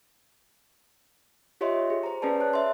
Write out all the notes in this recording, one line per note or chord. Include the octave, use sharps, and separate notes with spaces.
F4 G4 C#5 D#5 E5 C6
G#4
C5 A#5
C#4 G#4 B4 D5 A5
C#5 A5 F#6
E5 C6